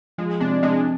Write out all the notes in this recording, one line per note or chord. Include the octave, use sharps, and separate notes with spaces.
F3 G#3
C3 D4
C3 G#3